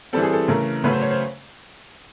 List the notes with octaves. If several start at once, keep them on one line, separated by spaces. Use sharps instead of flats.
E3 G3 C4 A4
G#4
A4
C#3 E3 A3 A#4
C#3 F#3 A3 C#4 B4
C5
C#5
C5